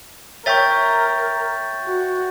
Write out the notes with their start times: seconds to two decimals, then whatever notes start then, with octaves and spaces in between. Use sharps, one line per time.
0.46 A#4 C#5 E5 G5 C#6 G6 A6
1.83 F#4